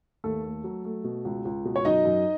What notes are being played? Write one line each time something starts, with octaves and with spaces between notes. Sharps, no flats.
D#2 A3 A4
A3
F#3
A3
B2
C#2
C#2
B2
C#5
F#2 D#4 D#5
F#2